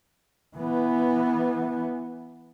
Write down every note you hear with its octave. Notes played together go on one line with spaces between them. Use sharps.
E3 B3